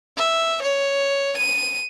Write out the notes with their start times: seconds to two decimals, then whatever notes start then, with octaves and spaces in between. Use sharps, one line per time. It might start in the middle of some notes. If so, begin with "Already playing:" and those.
0.17 E5
0.62 C#5
1.38 D#7